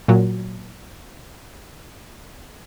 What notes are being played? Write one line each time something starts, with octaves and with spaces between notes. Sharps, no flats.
A#2 F#3